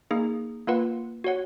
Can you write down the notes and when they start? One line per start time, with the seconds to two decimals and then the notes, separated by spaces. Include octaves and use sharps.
0.11 A#3 D#4 G#4
0.67 A#3 F4 B4 F#5
1.24 F#4 C#5 F#5